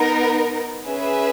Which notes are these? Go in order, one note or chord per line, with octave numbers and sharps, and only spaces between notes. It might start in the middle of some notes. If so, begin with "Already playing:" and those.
Already playing: B3 D#4 A#4
C#4 G#4 B4 E5